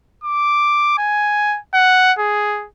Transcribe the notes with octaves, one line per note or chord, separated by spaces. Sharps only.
D6
G#5
F#5
G#4